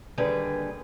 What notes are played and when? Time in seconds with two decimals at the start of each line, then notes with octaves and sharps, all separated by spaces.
0.18 D#2 D3 G3 G#4 B4